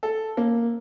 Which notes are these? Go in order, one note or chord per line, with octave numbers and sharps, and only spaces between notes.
A4
A#3